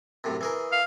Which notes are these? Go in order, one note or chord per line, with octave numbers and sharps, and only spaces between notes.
F#2 A2 C3
E3 G#4 A#4
F5